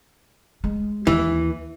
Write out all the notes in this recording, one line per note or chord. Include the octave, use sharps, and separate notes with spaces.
G#3
D#2 E3